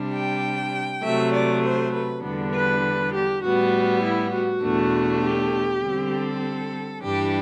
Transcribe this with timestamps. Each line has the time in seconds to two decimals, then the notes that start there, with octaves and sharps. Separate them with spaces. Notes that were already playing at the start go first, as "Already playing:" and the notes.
Already playing: C3 G3 D4
0.13 G5
1.02 C3 F#3 A3 E5
1.32 D5
1.62 C5
1.92 B4
2.22 E2 D3 G3 B3 D4
2.52 B4
3.12 G4
3.42 A2 G3 B3 F#4
4.02 E4
4.33 F#4
4.61 E2 B2 A3 D4
5.22 G4
5.81 D3 G3 C4
6.12 A4
7.02 G2 E3 G3 D4 G4